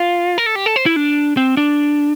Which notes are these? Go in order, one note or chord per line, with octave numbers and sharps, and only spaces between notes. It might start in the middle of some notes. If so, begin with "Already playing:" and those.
Already playing: F4
A#4
A4
G4
A4
C5
E4
D4
C4
D4